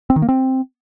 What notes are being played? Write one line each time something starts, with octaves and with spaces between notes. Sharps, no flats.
C4
D#3
A#3
C4